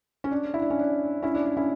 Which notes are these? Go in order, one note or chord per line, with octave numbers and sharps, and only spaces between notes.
C#4
D4
E4
D4
C#4
D4
C#4 E4
D4
D4
C#4 E4